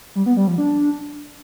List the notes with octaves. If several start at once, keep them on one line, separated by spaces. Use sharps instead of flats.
G3
B3
G3
F3
D4